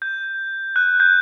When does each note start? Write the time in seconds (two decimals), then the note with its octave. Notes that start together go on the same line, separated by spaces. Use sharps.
0.02 G6
0.76 F#6
1.00 G6